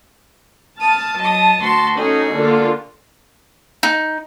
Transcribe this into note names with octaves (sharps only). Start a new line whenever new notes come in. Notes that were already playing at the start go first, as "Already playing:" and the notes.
A5 D#6 F6
F#3 D#5 D#6
D2 F#4 C6
C#4 D#4 F#4 G#4 A4
D3 A#3 F4
D#4